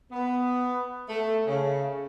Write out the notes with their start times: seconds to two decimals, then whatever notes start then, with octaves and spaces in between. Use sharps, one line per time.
0.12 B3
1.09 A3
1.47 C#3